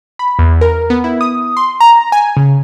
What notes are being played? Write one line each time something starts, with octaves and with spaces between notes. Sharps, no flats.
B5
E2
A#4
B3
E4
D#6
C6
A#5
G#5
C#3